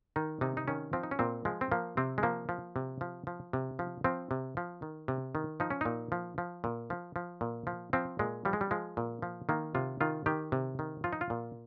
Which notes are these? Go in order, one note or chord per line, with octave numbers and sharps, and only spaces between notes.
D#3 D#4
C3 D#4
D#4
D#3 C#4
F3 C4
D#4
C#4
A#2 C4
F3 G#3
C4
F3 A#3
C3 C4
G#3
F3 A#3
F3
C3
F3
F3
C3
F3
F3 C4
C3
F3
D#3
C3
D#3
F3 D#4
C#4
A#2 D#4
F3
F3
A#2
F3
F3
A#2
F3
F3 C4
A#2 G#3
F3 G3
G#3
G3
F3 G#3
A#2
F3
D#3 A#3
C3 F4
D#3 F4
D#3 G4
C3
D#3
F3 F4
D#4
F4
A#2